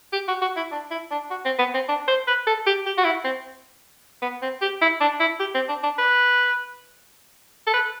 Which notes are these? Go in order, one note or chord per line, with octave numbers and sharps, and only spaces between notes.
G4
F#4
F#4
E4
D4
E4
D4
F#4
C4
B3
C4
D4
C5
B4
A4
G4
G4
F#4
E4
C4
B3
C4
G4
E4
D4
E4
G4
C4
D4
D4
B4
A4
B4